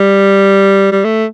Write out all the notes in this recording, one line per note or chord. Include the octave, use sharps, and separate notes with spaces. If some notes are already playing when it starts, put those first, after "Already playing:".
Already playing: G3
G3
A3